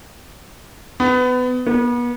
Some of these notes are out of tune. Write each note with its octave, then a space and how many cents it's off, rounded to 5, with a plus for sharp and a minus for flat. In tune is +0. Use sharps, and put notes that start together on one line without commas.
B3 +25
B3 -35